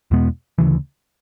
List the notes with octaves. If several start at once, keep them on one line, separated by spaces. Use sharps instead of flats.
E2 B2 G#3 B3
D2 C#3 E3